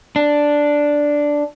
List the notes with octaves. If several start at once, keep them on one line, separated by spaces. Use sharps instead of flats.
D4